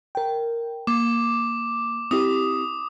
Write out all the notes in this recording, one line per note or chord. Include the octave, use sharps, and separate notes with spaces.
A#4 G5
A#3 D6
C4 E4 G4 D#6